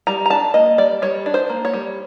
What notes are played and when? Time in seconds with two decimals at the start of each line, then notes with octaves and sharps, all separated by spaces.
0.07 G3 A#5
0.26 A#5
0.30 D4 A5
0.54 A#3 D#5
0.78 G3 D5
1.02 G3 C#5
1.26 D4
1.34 C5
1.49 A#3
1.65 C#5
1.73 G3